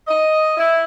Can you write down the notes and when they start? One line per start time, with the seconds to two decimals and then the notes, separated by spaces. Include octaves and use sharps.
0.08 D#5
0.57 E4